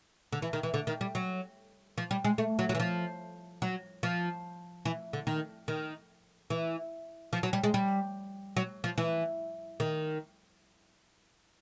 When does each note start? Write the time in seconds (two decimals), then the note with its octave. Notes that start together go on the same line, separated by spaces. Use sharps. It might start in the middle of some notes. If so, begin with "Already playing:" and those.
0.32 D3
0.42 E3
0.53 D#3
0.63 E3
0.74 D3
0.87 D#3
1.01 G3
1.15 F#3
1.98 F3
2.11 G3
2.25 G#3
2.38 A3
2.59 F#3
2.69 F#3
2.75 E3
2.80 F3
3.62 F#3
4.03 F3
4.85 E3
5.13 D3
5.27 D#3
5.68 D#3
6.50 E3
7.33 F3
7.43 F#3
7.53 G3
7.64 G#3
7.74 G3
8.57 F#3
8.84 F3
8.98 E3
9.80 D#3